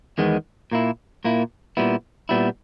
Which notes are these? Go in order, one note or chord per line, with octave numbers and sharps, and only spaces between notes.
E2 D#3 G#3 B3
A#2 A#3 E4
A#2 A#3 E4
A#2 G3 B3 E4
A#2 G3 B3 E4